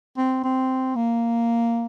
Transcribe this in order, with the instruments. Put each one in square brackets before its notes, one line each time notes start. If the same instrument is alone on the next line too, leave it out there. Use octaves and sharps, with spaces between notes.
[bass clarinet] C4
C4
A#3